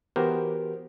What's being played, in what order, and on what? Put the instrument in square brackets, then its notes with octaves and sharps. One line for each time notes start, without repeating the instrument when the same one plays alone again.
[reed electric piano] E3 B3 F#4 G4 A#4 C5